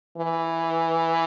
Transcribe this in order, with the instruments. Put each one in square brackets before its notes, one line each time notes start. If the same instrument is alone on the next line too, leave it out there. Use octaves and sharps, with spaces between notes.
[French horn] E3